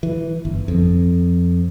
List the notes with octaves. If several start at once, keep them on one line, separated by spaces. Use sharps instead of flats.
E3
G1
F2